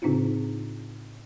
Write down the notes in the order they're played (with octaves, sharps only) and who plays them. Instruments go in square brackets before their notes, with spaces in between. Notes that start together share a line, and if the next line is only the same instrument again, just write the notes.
[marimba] A2 C#3 C4 D4 D#4 F4